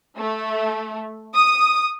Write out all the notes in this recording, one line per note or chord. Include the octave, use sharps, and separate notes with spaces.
A3
D#6